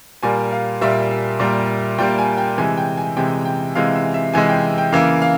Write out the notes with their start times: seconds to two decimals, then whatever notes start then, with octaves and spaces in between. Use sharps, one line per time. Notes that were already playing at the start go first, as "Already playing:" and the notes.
0.23 A#2 G3 A#3 G#5
0.53 F5
0.81 A#2 G3 A#3 E5
1.40 A#2 G3 A#3
1.98 A#2 G3 A#3 G5
2.19 G#5
2.38 G5
2.58 C3 E3 G#3 G#5
2.77 G5
2.97 G#5
3.17 C3 E3 G#3 G5
3.45 G5
3.75 C3 E3 G#3 F5
3.95 E5
4.14 E5
4.33 C3 E3 G#3 G#5
4.49 G5
4.78 G5
4.92 C#3 E3 A#3 F5
5.22 F5